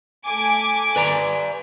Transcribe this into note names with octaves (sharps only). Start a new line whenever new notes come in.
A3 G#5 D6
B4 D5 A#5